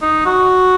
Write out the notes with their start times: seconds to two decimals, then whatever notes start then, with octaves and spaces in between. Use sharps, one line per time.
0.02 D#4
0.26 F#4